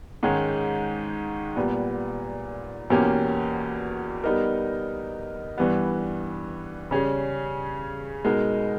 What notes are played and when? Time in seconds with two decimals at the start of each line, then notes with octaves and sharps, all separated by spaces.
0.23 G#2 D#3 G#3 C#4
1.56 A#2 G3 B3
2.90 E2 B2 A#3 C#4 G4
4.24 G3 B3 D#4 A#4
5.58 G2 E3 G3 B3
6.91 C#3 G3 C#4 G#4
8.25 B2 G#3 D#4 A#4